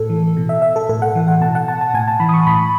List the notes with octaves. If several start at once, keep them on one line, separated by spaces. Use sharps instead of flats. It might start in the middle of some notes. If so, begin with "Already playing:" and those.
Already playing: A2 A4
E3
B2
E5
E5
A4
A2 A4
F#5
E3
F#5
B2 A5
F#5
A5
A5
A2 G#5
A5
E3 B5
D#6
C#6
A2 B5